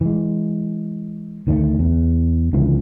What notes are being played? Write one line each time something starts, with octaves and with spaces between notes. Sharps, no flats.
E3 G#3
D2 D#3 F3 A3
E2
C#2 D3 E3 F3